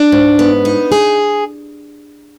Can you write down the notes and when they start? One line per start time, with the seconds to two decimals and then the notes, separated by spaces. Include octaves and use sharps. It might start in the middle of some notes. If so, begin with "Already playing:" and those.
Already playing: D4
0.12 G#2
0.39 B3
0.65 D#4
0.92 G#4